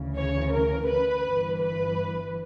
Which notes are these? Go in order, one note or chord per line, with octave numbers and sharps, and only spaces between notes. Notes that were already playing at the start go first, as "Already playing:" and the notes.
Already playing: D2 C#3 E3
C#5
A#4
B4
G1 G2 E3
B4